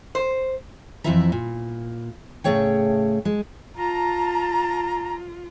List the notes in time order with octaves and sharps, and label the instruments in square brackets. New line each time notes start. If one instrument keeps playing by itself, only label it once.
[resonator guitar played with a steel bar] C5
[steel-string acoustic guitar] F2 E3 F3 E4 E5 A#5
A#2
A2 C#3 A3 G#4 C#5 G5
G#3
[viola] F4 [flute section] A5 A#5